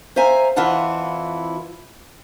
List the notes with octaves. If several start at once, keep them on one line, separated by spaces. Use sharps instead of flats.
C5 E5 F5 G#5 A#5
F2 E3 E4 F4 F#5 A5